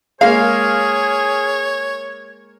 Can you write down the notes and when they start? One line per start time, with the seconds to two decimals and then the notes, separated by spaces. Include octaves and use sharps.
0.21 G#3 A#3 G#4 C#5 F5